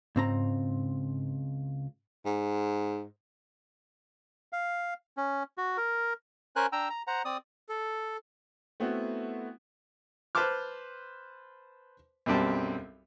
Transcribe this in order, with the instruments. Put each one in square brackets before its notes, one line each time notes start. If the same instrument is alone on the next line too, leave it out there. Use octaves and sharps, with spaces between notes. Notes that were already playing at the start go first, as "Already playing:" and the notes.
[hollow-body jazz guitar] C#2 C4 A#5 [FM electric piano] G#2
[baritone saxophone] G#2
[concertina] F5
C#4
F#4
A#4
C#4 A#4 C5 G#5 F#6
D4 G5 A#5 E6
A#5
C5 F#5 A#5
C4 D5 D#6
[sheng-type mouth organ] A4
[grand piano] A3 B3 C4 E4 F#4
[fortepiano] B4 C5 A5 C6 D6 F6
B1 F#2 G3 C4 A5